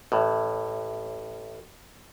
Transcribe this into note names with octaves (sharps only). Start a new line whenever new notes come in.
A1 A2